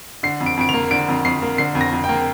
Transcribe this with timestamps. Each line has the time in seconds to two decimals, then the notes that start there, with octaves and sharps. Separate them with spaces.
0.23 D3 C7
0.41 F2
0.46 D7
0.57 F2 D7
0.69 F7
0.74 A#3
0.91 D3 D7
1.09 F2
1.25 F2 C7
1.42 A#3
1.58 D3 C7
1.75 F2
1.81 A#6
1.92 F2
2.04 G5
2.09 A#3